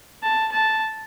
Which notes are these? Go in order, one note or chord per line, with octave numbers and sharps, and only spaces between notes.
A5
A5